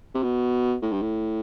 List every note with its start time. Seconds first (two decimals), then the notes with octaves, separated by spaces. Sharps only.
0.14 C3
0.23 B2
0.82 A2
0.92 G2
1.02 A2